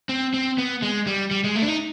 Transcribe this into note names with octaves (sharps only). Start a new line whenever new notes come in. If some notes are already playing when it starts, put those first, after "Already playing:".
C4
C4
B3
G#3
G3
G3
G#3
A3
D4
D#4